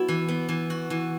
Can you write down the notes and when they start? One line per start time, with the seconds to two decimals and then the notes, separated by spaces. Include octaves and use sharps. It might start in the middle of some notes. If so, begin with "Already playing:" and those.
Already playing: B3 E4 F#4
0.08 E3
0.28 B3
0.49 E3
0.70 F#4
0.90 E3